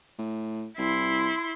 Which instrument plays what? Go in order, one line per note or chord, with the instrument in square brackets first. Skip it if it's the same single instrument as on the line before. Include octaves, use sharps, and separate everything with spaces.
[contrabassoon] A2
[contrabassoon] C2 [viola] E4 C6